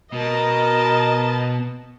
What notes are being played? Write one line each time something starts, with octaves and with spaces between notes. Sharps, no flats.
B2 A#4 D#5 A5